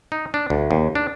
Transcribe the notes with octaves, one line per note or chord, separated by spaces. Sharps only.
D#4
D4
D2
D#2
D4